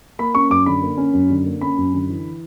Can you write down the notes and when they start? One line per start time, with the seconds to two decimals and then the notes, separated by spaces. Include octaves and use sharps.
0.19 A#3 B5
0.35 C#4 C#6
0.50 F#2 D6
0.66 D3 B5
0.83 A#3
0.98 C#4
1.13 F#2
1.30 D3
1.46 A#3
1.61 C#4 B5
1.77 F#2
1.94 D3
2.09 E3